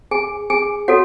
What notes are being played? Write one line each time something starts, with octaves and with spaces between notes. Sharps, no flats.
G#4 G#5
G#4 G#5
F#4 A4 C#5 F#5